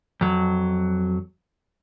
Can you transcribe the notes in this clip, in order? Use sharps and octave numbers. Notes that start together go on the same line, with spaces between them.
F2 F#3